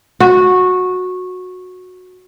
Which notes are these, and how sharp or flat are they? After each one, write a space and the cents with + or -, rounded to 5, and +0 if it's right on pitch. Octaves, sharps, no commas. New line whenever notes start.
F#4 -15